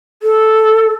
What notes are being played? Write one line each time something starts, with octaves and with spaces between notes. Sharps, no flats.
A4